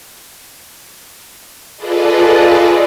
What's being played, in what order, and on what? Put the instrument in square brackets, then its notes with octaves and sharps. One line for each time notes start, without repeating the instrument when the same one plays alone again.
[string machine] F4 G#4 A4 B4 D5 D#5